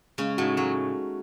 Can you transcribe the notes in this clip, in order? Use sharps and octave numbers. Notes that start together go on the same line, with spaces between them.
C#3 G#3 C#4
A2 A3 D#4 F#4
F#3 G#3